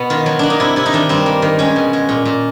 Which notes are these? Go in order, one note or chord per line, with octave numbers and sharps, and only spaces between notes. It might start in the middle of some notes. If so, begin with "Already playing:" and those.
Already playing: B2 B3
D#3 F4
F#3
A#3 D4
D#4
C3 E4
C3 E4
D#4
D#3 D4
G2 C4
A#3
D#3
G#3 C#4
B2
G#3
A#2
A#2